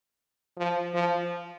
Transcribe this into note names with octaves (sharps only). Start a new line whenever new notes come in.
F3
F3